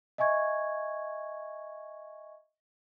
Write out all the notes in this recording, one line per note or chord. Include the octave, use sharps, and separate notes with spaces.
D#5 E5 G#5 C#6 G#6